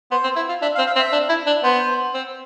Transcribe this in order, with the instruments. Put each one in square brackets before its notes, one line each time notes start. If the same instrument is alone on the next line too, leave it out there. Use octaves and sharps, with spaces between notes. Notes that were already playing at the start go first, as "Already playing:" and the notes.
[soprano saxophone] B3 [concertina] C5
[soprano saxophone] C4
E4
F4
[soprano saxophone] D4 [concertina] E5
[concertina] F5
[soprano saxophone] C4
[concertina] F5
[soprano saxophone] C4
[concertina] E5
[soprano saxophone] D4
E4
D4
[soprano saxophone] B3 [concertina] C5
[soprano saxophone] C4